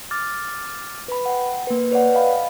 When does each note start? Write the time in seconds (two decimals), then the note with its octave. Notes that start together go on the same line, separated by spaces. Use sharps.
0.11 D6 F6 A6
1.08 B4 B5
1.25 F#5 G5
1.67 A#3 B4
1.92 B4 C#5 D5 F#5
2.15 D#5 F5 G5 B5